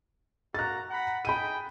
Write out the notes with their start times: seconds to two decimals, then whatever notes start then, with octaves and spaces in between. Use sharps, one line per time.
0.54 A#3 F#4 A#5 F#6 A6
0.90 F#5 A#5 B5
1.25 D#4 G#4 G5 B5 D#7